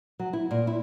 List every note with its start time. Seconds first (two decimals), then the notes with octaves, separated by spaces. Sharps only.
0.19 F#3
0.33 E4
0.51 A#2
0.67 E4